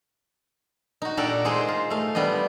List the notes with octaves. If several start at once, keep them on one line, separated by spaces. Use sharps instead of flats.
D#4 F#4
A#2 D4 G4 A4 A#4 F#5
G#3 D#4 G#4 C5
F4
A3 F5
G3 B3 D4 D#5